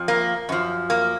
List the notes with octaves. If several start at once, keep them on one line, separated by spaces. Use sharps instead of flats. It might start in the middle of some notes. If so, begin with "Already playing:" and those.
Already playing: F2 F3
A#3
F#2 F3
A#3